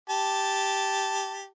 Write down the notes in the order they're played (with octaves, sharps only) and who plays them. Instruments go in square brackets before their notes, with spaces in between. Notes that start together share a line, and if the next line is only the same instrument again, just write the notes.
[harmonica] G4 A5